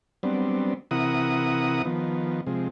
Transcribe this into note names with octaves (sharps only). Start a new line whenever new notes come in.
F#3 G3 B3 C4 D4
C3 E3 E4 A#4 F#5 D#6
D#3 F3 B3
C3 F3 G#3